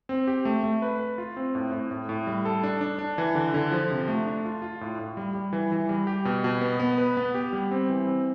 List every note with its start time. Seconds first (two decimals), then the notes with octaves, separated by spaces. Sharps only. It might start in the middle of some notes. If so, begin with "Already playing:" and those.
0.09 C4
0.28 G4
0.45 A3
0.64 A3
0.82 B4
0.99 B4
1.18 F4
1.37 C4
1.55 A2
1.72 A2
1.91 A2
2.09 A2
2.27 G3
2.45 A4
2.63 D4
2.81 D4
2.99 D4
3.18 E3
3.35 D3
3.54 D3
3.72 F3
3.91 C3
4.08 A3
4.26 D4
4.45 F4
4.62 F4
4.81 A2
4.99 A2
5.17 G3
5.35 G3
5.53 E3
5.72 E3
5.89 G3
6.07 G4
6.25 B2
6.44 B2
6.61 B3
6.80 B3
6.98 B4
7.17 B3
7.34 G4
7.53 G3
7.71 C4
7.90 E3
8.07 C4